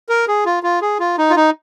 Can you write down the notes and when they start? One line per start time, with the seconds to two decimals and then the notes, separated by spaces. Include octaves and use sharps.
0.09 A#4
0.28 G#4
0.46 F4
0.63 F4
0.82 G#4
1.00 F4
1.18 D#4
1.30 F4
1.36 D#4